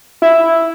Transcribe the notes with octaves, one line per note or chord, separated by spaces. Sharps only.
E4